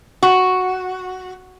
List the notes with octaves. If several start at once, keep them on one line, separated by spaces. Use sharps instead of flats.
F#4